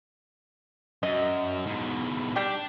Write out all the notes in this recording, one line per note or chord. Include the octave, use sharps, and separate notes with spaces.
F#2 D#5
G#2 B2
G3 D4 G4